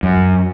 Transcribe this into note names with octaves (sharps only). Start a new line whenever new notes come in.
F#2